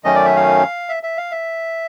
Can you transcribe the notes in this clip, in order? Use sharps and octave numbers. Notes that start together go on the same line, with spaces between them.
F#2 D#3 F#3 A3 C#4 D#5
D5
E5
F5
E5
E5
F5
E5